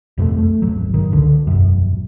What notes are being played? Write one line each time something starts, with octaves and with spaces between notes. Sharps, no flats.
B1 F2 E3 A3
A3
D#1 G#1 F#3
G1 D#3
C#2 D3
E1 A#1 F#2